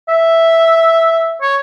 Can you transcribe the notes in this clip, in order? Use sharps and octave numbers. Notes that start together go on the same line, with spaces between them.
E5
C#5